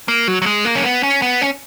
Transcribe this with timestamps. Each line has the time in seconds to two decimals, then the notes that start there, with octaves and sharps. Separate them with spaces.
0.08 A#3
0.28 F#3
0.42 F#3
0.46 G#3
0.65 A#3
0.75 C#4
0.85 B3
1.03 C#4
1.22 B3
1.41 C#4